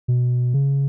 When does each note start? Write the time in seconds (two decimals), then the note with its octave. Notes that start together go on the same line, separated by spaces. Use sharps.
0.08 B2
0.54 C#3